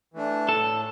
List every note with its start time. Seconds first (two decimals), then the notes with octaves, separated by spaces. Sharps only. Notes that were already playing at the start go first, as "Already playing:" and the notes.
0.14 E3 A3 D4
0.49 A2 A4